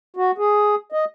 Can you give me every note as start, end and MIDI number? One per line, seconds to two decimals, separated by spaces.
0.17 0.31 66
0.38 0.75 68
0.92 1.05 75